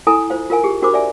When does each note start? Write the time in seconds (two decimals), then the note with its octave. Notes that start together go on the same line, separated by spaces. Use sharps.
0.07 E4 A4 G#5 A#5 D#6
0.30 F4 C5 F5
0.50 F4 A#4 F5 G#5
0.64 G4 G#4
0.82 D4 F#4 A#4 C5 B5 D6
0.94 D5 E5 G#5